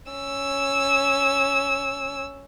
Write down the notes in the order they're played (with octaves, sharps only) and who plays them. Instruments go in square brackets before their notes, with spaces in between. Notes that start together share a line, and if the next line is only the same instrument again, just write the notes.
[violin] C#4 E6